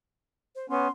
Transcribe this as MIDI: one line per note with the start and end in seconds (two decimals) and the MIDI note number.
0.56 0.69 72
0.70 0.88 59
0.70 0.88 61
0.70 0.91 84